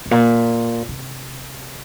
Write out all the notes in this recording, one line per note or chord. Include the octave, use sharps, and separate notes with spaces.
G2
A#2
C3